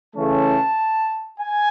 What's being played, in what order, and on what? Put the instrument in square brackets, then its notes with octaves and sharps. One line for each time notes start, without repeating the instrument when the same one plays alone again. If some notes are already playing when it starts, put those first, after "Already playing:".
[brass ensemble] C#3 E3 A3 C#4 A5
G#5